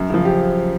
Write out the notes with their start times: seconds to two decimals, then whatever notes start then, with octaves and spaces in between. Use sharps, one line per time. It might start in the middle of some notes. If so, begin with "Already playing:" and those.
Already playing: F#2
0.10 C#3 F3
0.25 G4